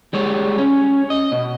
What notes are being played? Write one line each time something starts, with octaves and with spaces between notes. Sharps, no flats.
G3 G#3 C#5
C#4
D#5
B2